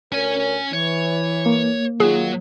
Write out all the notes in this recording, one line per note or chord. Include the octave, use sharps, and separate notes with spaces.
D2 C#4 A#4 C#5 G#5
E3 C#5
A#3
D#3 F#3 F4 G#4